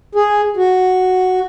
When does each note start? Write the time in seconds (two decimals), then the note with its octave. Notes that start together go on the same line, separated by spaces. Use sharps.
0.15 G#4
0.57 F#4